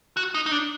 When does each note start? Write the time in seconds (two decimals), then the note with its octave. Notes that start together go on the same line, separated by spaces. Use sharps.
0.17 F#4
0.34 D#4
0.46 D#4
0.52 D4